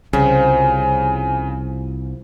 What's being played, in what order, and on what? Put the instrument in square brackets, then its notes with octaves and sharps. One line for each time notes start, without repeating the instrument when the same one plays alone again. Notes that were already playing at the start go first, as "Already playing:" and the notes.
[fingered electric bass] C2 [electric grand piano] C#3 [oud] F3 G3 [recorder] G#5